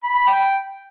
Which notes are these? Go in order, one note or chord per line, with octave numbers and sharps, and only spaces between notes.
B5
B5
G5